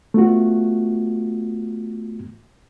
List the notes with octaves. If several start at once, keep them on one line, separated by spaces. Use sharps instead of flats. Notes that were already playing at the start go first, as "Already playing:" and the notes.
A3 B3 F4 F#4